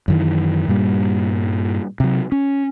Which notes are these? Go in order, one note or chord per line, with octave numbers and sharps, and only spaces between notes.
F#2 D#3 E3
G2 A#2 G3
C3 F#3
C#4